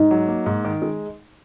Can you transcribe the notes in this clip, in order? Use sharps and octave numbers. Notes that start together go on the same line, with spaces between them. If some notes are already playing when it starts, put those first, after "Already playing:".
Already playing: G#2 D#4
F#3
A#3
G#2
D#3
G#3